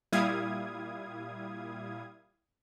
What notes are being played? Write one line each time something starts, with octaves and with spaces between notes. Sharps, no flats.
A#2 G3 E4 F5 D#6 G#6